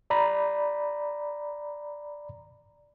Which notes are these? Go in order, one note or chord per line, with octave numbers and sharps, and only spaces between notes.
D5 A#5 B5